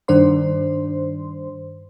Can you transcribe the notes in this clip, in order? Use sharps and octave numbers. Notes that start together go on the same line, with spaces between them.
G2 D#3 D4 C5 C6